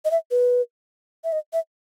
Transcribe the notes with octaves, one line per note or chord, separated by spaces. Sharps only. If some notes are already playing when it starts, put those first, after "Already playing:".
D#5
E5
B4
E5
D#5
E5